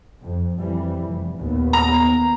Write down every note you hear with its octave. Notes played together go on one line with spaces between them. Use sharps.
F2
F2 E3 G3
F1
D#2 A#2 B3
A#5